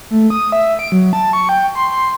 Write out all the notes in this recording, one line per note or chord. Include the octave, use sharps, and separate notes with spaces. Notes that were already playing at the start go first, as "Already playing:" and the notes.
A3
D#6
E5
D7
F#3
A5
C#6
G5
C6
C6